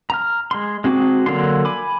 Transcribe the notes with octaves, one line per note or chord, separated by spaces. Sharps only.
A#5 F6
G#3 C6
G#3 C4 F#4 G#4 D6
D3 F#3 A#3 D4 C6
G#5 B5 D6